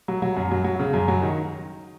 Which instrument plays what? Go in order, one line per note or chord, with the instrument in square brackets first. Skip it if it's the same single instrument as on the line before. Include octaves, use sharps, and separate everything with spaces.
[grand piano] F#3
F#3
F#2
F#3
F#3
C#3
F#2
F#3
D#3